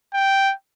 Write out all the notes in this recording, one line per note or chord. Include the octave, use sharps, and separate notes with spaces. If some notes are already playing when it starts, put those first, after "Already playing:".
G5